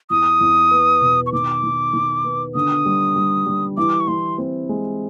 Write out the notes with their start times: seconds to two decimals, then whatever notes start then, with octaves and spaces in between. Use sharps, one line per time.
0.10 E2 D#6
0.41 E2
0.71 B3
1.01 B2
1.26 C#6
1.32 D#3 D6
1.63 D#3
1.93 D#3
2.24 B3
2.55 D3 D#6
2.86 G3
3.16 G3
3.46 G3
3.77 E3 D6
4.00 C#6
4.08 E3 C6
4.38 C4
4.69 G#3